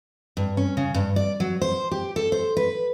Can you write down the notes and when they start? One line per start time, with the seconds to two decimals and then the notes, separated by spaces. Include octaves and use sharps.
0.37 G2
0.57 C#4
0.77 C#3
0.94 G2
1.16 D5
1.40 F#3
1.62 C5
1.91 G4
2.16 A4
2.32 C5
2.57 B4